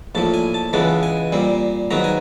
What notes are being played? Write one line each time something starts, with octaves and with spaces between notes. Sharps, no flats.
A#1 A2 F3 A5
G#5
A5
C#2 C#3 E3 G#3 B3 A5
G#5
A#2 G3 C4
G#2 D#3 F#3 B3 A#5
G#5